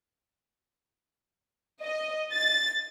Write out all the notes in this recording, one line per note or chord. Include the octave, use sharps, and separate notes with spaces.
D#5
A6